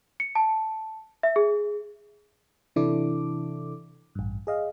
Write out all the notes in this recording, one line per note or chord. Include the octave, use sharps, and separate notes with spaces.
C#7
A5
E5
G#4
C3 E3 D4 E4 A4 D6
A1 G2
G#4 D#5 F5